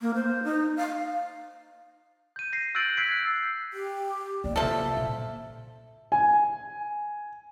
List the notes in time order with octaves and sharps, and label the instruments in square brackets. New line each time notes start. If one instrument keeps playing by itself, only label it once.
[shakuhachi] A#3
C5
D#4
F5
[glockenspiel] G6 D#7
A#6 C7
E6 F#6 G6 A6 D7 F#7
E6 F#6 G#6 B6 C7 D7
F#6
[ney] G4
[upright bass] B1 A#3 [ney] D5
[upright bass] C3 E4 [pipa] F3 A4 [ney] E5
[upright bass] A#2
[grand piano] G#5